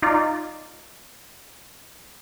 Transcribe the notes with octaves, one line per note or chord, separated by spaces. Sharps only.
D#4 F4 D5